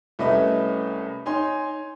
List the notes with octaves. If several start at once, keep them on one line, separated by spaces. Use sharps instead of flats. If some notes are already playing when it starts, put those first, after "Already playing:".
C2 A3 C#4 B4 D#5
D#4 C#5 G#5 C6